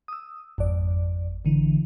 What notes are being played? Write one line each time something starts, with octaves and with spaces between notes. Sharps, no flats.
D#6 E6
G#1 F2 D5
A1 D3 E3